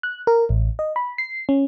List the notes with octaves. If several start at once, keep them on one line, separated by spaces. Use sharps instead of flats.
F#6
A#4
A1
D#5
B5
C7
C#4